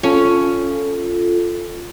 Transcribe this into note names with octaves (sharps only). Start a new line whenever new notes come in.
C#4 F4 A4